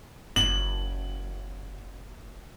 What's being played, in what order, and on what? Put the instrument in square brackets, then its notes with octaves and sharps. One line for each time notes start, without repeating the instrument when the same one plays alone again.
[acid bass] F#1 [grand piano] F#7